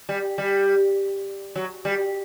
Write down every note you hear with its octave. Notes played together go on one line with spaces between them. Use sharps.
G3
G3
F#3
G3